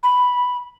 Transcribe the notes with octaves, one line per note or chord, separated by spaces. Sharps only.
B5